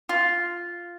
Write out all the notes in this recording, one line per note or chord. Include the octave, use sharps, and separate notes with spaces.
F4